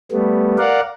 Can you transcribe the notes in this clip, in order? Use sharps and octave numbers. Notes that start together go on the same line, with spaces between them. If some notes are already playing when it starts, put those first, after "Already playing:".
G3 A3 B3
A#4 D5 F5 F#5